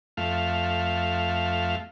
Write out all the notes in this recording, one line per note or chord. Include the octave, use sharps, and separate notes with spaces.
F2 A3 F5